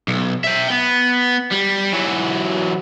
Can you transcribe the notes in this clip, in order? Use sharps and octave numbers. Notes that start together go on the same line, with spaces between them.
B1
E5 G5
B3
G3
E3 F#3